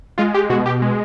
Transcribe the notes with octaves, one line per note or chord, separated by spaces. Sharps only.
G#3 F4
G4
B2 F#4
G4
G#3